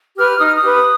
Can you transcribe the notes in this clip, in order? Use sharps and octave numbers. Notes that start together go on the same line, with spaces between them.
G4 B4 F6
D#4 D#6
F6
D#6
G4 B4